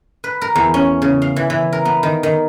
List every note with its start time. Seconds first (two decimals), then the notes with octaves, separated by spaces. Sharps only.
0.24 B4
0.42 A#4
0.56 E2
0.74 C#4
1.02 C#3
1.22 F5
1.36 E3
1.50 E3
1.73 A#4
1.85 B3
2.03 D#3
2.23 D#3